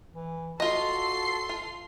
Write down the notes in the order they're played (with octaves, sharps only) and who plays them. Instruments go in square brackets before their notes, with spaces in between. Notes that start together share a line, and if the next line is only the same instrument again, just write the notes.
[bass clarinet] E3
[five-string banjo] F4 D#5 [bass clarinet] F#4 [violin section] A4 C6 C7
[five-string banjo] F4